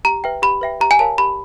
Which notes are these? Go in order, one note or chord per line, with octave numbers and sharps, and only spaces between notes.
G4 A#5
B4 E5 G5
G4 B5
B4 E5 G5
G4 A#5
G#5
A#4 C#5 F5 A5
G4 B5